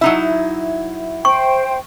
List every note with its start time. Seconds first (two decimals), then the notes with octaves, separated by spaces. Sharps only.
0.01 F#3 D#4 E4 E5
1.25 C5 G5 C#6